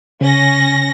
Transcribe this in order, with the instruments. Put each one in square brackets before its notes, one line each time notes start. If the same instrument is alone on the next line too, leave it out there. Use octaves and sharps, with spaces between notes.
[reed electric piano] C#3 [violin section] C#4 A#6